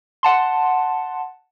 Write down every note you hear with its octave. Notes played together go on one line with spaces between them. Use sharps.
F#5 A5 C6